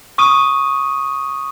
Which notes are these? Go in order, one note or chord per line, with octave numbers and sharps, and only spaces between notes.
C#6 D#6 D#7